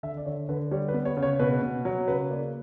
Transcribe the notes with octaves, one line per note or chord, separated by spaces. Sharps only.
D3 E5
D5
D3 C#5
D3 B4
G3 C#5
B4
B3
C#5
C#3
C#5
B2 B4
B2
F#3
C#3 B4
A#3 D5